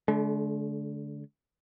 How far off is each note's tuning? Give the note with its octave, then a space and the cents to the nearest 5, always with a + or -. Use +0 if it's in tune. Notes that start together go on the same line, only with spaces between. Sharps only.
D3 -20 G#3 +45